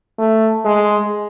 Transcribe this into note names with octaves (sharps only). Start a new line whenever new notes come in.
A3
G#3